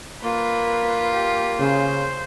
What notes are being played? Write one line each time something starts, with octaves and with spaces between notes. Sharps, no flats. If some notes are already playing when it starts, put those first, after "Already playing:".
A#3 F4 B4
G4
C#3 C5